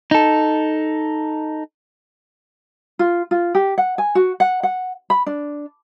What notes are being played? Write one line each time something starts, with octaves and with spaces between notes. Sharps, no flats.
D#4 A4
F4
F4
G4
F#5
G#5
F#4
F#5
F#5
B5
D4